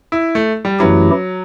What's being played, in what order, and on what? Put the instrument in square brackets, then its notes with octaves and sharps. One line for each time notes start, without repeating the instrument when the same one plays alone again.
[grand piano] E4
A3
G3
[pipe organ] F#2 E3 A3 E4 G4 [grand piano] F#3